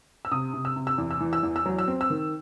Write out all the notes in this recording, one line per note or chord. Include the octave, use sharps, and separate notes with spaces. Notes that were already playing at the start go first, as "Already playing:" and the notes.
E6
C3 D#6
C3
E6
C3
E6
E2
E6
E3
E6
E2
E6
F#3
E6
C4
E6
D#3